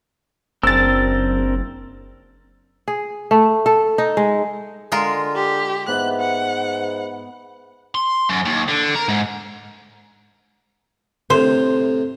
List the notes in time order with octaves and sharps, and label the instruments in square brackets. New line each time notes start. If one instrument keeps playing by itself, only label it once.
[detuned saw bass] F#1 [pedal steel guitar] C4 D4 A#4 [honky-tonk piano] E6 A6
[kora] G#4
A3
A4
D#4
G#3
[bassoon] D3 [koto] G#3 F4 A#4
[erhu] G4
[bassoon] G#2 [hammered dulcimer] B3 E5 [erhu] F#6
[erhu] F#5
[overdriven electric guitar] C6
F#2
D#2
D3
A#4
G#2
[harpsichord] A2 C3 [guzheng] C5